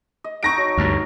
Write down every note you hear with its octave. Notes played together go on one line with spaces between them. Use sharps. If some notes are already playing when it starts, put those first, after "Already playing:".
D#5
D#4 A4 F#5 C#6 A#6 D7
F#3
D2 G2 A#5